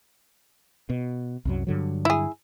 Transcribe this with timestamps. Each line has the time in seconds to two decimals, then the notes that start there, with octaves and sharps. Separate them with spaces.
0.90 B2
1.45 C2 F#2 F#3
1.67 G2 D3 F#3
2.05 E4 G#4